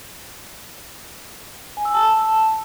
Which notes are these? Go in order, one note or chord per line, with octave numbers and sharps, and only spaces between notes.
G#5
E6
A5